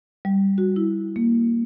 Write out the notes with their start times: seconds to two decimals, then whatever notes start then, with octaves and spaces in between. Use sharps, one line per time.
0.25 G3
0.58 F#4
0.76 E4
1.16 A#3